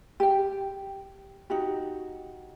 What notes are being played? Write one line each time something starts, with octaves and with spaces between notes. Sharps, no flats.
G4 G5
D#4 F#4 G4